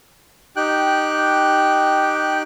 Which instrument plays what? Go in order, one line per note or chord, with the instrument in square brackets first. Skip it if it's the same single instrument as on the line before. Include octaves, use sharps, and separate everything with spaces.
[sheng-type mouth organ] D#4 G4 G5 F#6